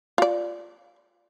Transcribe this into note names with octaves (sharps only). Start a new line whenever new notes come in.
F4 D5